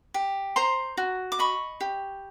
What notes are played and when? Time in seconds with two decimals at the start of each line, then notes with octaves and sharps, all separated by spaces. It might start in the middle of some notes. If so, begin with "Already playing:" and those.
0.14 G4
0.56 C5 A#5 C6
0.97 F#4
1.32 D6
1.39 D#5 B5 C#6
1.81 G4